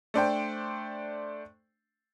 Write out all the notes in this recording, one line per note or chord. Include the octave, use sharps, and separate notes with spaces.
A3 D4 C5 G5